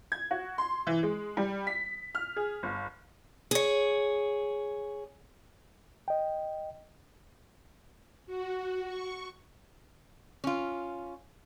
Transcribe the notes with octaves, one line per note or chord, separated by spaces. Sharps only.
G#6
F#4
C6
E3
G#3
G3
B6
F6
G#4
G1
G#4 C#5
D#5 G5
F#4
C#6
C#4 F4